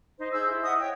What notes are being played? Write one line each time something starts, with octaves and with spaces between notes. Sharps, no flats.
D#4 C5
G#4 C5 E6 G6
E4
E4 D#5 F#5 D#6
C#5 G5